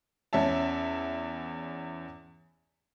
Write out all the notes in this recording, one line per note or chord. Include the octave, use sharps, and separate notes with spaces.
E2 C#4 E5 A5